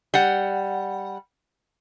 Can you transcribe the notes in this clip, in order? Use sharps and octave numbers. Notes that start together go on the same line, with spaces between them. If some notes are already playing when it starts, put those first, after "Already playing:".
G3 F#5